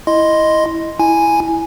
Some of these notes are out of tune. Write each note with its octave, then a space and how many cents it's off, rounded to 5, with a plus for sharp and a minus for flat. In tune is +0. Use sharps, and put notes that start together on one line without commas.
E4 +0 D#5 +0 C6 +0
E4 +0 G#5 +0